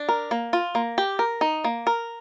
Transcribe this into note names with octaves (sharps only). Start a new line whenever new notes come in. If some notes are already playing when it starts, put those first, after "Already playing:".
Already playing: D4
A#4
A#3
F4
A#3
G4
A#4
D#4
A#3
A#4